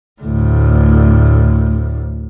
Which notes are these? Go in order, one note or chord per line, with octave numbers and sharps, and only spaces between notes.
D2 A2